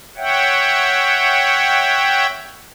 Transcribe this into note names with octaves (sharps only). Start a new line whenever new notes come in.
C#5 E5 F#5 G5